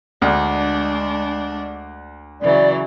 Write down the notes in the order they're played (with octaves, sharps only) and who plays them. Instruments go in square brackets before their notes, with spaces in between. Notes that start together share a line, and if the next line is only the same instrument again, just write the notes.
[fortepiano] D2 [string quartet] G#3 D4
[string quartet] C#3 E3 F#3 [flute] D5